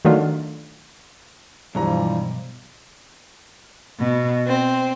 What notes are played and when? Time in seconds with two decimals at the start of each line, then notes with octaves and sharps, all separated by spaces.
0.05 D#3 F#3 A3 D4 F4
1.75 B1 G2 E3 F3 G3 A#5
3.97 B2
4.47 C4